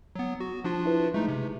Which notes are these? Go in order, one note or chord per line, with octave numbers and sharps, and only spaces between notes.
F#3 B3
F#4
F3 D4 F4
E4 B4
G#3 A3 D#4
C3